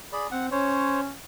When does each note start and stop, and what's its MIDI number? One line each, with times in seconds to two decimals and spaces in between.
0.13 0.27 68
0.13 0.27 74
0.13 0.27 83
0.32 0.47 60
0.32 0.47 78
0.52 1.12 61
0.52 1.01 72
0.52 1.01 73